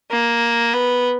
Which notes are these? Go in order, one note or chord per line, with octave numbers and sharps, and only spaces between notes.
A#3
B3